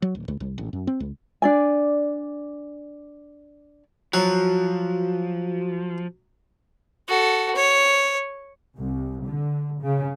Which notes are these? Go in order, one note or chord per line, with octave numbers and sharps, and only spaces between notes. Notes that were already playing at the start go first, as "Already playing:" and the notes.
F#3
D1
C#2
C2
A1
F#2
C4
C#2
D4 D5 G#5
F3 F#3 F#4
F#4 A4
C#5
C2
D3
C#3